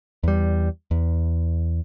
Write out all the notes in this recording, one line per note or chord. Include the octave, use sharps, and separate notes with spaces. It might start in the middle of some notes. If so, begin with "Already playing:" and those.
E2 G3
E2